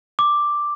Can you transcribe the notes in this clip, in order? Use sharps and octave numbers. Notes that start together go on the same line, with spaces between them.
D6